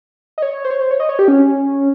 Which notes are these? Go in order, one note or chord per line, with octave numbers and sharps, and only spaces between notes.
D#5
C#5
C5
C#5
C5
C#5
D#5
C#5
G4
C#4